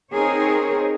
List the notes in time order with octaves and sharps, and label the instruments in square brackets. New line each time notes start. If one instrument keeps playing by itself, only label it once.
[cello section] C4 D#4 G#4 A#4 C5 C#5